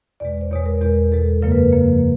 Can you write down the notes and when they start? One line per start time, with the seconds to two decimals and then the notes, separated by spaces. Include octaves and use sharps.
0.20 E2 B2 G#3 D5
0.41 C5
0.51 E2 B2 G#3 C#5
0.66 A#4
0.81 E2 B2 G#3 A#4
1.12 E2 B2 G#3 A4
1.42 F#2 C#3 F3 A#3 A#4
1.52 B4
1.72 F#2 C#3 F3 A#3